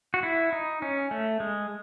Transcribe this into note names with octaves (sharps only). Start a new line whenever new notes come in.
F#4
E4
D#4
C#4
A3
G#3